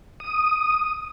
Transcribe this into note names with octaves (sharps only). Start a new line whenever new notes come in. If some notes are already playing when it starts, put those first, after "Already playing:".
D#6